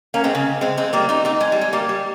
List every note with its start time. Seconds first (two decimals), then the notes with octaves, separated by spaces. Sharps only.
0.14 A#3 C#4
0.24 G#3 C4
0.35 C#3
0.61 G#3 C4
0.77 G#3 C4
0.93 G3 A#3
1.09 C4 D#4
1.25 C4 D#4
1.40 G#3
1.52 G3
1.61 G#3
1.73 G3 A#3
1.89 G3